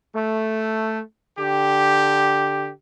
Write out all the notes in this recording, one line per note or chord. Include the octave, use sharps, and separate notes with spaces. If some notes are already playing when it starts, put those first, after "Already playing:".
A3
D3 G4